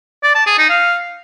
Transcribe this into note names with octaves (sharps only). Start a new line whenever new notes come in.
D5
A5
G#4
D#4
F5